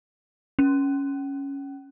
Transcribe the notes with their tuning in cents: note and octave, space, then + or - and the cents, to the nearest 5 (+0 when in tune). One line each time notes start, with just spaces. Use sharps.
C#4 +0